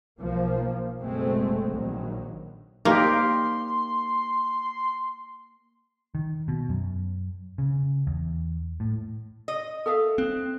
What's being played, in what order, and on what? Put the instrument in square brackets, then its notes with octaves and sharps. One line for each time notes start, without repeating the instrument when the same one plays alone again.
[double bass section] B1 F3 A#3
F#1 B2 G#3 A3 C4
A#1 D#3 F#3
[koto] A#3 [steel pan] D#4 G4 A#4 [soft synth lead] C6
[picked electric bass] D#3
B2
F#2
C#3
E2
A2
[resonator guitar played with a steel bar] D#5
[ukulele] A4 E5 F5 [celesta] D#6
[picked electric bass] C4 [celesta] F#6